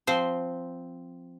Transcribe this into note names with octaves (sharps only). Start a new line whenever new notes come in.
F3 C4 C5